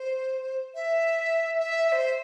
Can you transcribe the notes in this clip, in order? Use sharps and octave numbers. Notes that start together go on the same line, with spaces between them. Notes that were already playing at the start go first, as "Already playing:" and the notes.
Already playing: C5
E5
E5
E5
C5